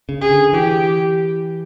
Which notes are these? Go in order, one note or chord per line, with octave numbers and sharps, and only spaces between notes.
C#3
G#4
D3
E3 G4